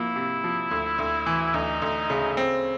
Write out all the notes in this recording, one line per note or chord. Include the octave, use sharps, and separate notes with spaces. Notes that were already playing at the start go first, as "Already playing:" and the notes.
Already playing: F3 A#3 E4
C3
F3
D2
D2
E3
D2 D#4
D2
C#3
C4